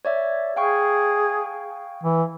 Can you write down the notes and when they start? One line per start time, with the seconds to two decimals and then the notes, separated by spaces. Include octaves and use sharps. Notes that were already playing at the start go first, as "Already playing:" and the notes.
0.05 C#5 D5 E5
0.56 G#4 F5 G5 C#6
2.04 E3